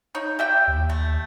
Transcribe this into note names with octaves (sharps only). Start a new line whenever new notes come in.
D#4 C#5
G4 E5 G5
D#2
A3